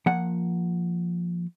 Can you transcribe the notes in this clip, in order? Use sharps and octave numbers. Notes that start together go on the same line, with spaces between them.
F3 A#3 F#5